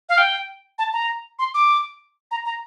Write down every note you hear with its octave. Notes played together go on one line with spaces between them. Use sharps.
F5
G5
A5
A#5
C6
D6
A#5
A#5